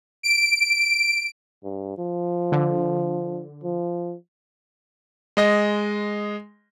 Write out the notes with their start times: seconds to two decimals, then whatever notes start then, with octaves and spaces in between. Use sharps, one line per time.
0.23 D7
1.64 G2
1.98 F3
2.52 D3
3.64 F3
5.37 G#3 D#5 A#6